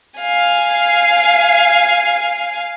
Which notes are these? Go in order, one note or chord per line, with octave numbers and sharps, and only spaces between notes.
F5 G#5